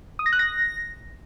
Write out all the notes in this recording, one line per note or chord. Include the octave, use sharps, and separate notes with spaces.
D#6
A#6
F#6
A#6